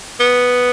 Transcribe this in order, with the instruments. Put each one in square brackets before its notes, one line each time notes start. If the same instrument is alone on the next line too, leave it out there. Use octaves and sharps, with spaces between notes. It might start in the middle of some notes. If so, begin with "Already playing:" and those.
[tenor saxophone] B3